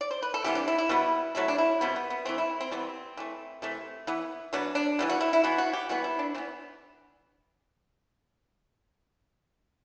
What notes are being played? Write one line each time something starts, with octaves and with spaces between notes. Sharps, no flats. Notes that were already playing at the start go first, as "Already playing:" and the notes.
D5
C5
B4
A4
C3 E3 G3 B3 G4
D4
E4
E4
B2 G3 B3
C3 F#3 A3 E4
D4
E4
B2 G3 B3 C4
B3
B3
E3 A3 C4
E4
C4
E3 G3 B3 C4
E3 A3
C3 E3 A3
E3 B3
B2 F#3 B3 D4
D4
E3 G3 B3
F#4
E4
E4
E3 B3 F#4
F#4
G4
E3 G3 B3 F#4
E4
D4
E3 B3 C4